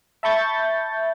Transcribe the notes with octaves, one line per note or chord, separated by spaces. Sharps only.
E5 A5 B5 C#6 G6 A6